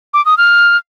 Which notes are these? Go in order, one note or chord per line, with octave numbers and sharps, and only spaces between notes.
D6
D#6
F6